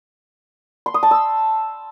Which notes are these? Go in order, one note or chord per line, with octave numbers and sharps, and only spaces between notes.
C6
D#6
A5
E6